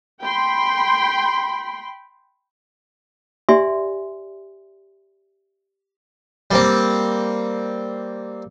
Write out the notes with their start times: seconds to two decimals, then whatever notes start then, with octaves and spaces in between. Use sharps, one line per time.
0.21 G5 B5 C6
3.49 G4 D5 E5 G#5 C6
6.51 G3 A#3 C4